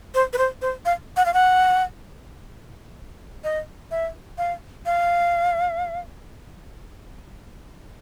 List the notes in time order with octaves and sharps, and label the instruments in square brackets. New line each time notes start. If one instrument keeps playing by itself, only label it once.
[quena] C5
B4
C5
C5
F5
F#5
F5
F#5
D#5
E5
F5
F5